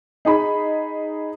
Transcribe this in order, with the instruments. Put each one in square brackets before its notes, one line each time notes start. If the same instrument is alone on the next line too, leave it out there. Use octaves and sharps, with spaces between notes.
[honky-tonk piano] D#4 G#4 B5